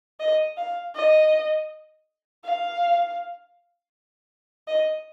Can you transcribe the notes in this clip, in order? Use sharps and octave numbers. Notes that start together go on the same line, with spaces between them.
D#5
F5
D#5
F5
D#5